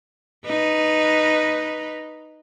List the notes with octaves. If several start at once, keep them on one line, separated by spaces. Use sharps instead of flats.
D#4 B4